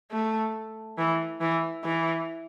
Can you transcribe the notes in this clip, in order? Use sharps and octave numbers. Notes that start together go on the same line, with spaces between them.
A3
E3
E3
E3